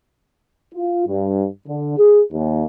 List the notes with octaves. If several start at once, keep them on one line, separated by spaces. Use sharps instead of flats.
F4
G2
D3
G#4
D#2